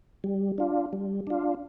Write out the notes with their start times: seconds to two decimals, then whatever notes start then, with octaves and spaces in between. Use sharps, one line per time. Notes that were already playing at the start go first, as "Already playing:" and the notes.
0.24 G3
0.58 D4 F4
0.93 G3
1.27 D4 F4